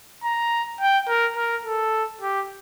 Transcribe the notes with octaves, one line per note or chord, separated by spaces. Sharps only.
A#5
G5
A#4
A#4
A4
G4